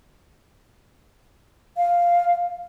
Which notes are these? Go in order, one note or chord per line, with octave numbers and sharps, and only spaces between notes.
F5